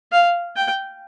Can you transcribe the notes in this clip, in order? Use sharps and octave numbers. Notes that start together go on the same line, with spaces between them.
F5
G5